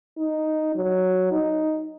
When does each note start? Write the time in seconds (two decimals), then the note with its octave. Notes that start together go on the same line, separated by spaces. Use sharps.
0.18 D#4
0.75 F#3
1.32 D#4